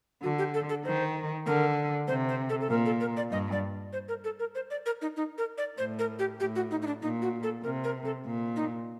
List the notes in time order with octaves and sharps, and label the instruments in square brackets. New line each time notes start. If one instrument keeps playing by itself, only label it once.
[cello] D3 [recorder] F#4
[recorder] G4
A4
A4
[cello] D#3 [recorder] C5
[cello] D3 [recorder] A#4
[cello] C3 [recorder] C5
[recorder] C5
A4
A4
[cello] A#2 [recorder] A#4
[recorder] A4
A#4
D5
[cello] G2 [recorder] D#5
[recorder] D5
C5
A#4
A4
A#4
C5
D5
A#4
D#4
D#4
A#4
D5
[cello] A2 [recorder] C5
[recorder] A#4
G4
[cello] A2 [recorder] G4
[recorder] F#4
D#4
D#4
D4
[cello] A#2 [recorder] D#4
[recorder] F#4
A4
[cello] C3 [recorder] A#4
[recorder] A#4
A4
[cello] A#2
[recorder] D#4